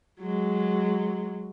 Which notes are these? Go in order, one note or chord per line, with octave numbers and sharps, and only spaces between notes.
F#3 G#3